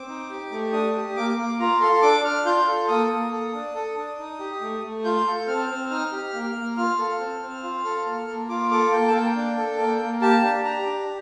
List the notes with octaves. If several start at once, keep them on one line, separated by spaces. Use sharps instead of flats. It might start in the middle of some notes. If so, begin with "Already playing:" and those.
Already playing: C4 D6
D#4
G4
A3
D4 D#6
G4
A#3 D6
A#3
F4 A#5
A4 C6
D4 D6
D4 F6
F4 G6
A4
A#3 D#6
A#3
A4
D4
A4
D4
D#4
G4
A3
A3
F4 G6
A4
C4 F6
C4
D#4 F6
G4
A#3
A#3
F4 F6
A4
C4
C4
F4
A4
A#3
A#3
F4 D6
A4 D6
A#3 G5
A5
A#3 G5
D4
A4
A#3
A#3
G4 A5
D4
G4 A#5
D4